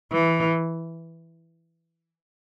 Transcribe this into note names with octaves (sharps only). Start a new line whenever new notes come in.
E3